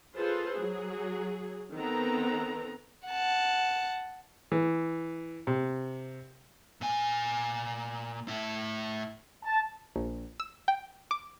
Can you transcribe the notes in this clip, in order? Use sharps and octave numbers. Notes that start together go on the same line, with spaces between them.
F4 G#4 A4 B4 C5
F#3 G#4
D#3 B3 C4 A4 A#5
F#5 A5
E3
C3
A#2 G#5
A2 E4
A5
A#1
E6
G5
D6